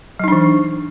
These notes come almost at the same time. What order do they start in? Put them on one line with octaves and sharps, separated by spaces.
F#3 D#4 D4 E3